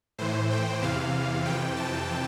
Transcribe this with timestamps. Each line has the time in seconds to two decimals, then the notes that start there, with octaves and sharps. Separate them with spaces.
0.18 A2 E3 C5
0.51 G5
0.82 E2 C3 E3 F5
1.45 F2 C3 E3 G5
1.77 A5